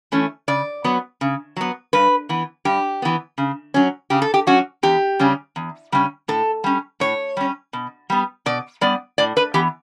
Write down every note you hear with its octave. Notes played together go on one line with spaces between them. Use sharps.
E3 A3 C#4
C#3 D5
F#3 B3
C#3
F#3 B3
G2 B4
E3 B3
G2 G4
E3 B3
C#3
F#3 C#4
C#3 G4
A4
G4
F#3 C#4 F#4
E2 G4
C#3 G3 C#4
E2
C#3 G3 C#4
A2 A4
G3 C#4
A2 C#5
G3 C#4
B2
G3 B3
B2 D5
G3 B3 D5
A2 D5
B4
E3 B3 G4